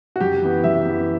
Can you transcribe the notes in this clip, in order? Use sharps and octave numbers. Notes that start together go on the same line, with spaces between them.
F#4
F#2 G4
E3 B3
F#2 E5
E3 B3